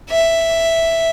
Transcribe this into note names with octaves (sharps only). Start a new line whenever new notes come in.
E5